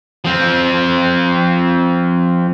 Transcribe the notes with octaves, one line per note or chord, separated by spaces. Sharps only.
F3 C4